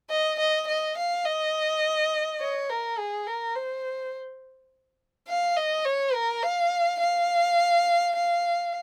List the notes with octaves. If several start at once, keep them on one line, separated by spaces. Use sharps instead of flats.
D#5
D#5
D#5
F5
D#5
C#5
A#4
G#4
A#4
C5
F5
D#5
C#5
A#4
F5
F5
F5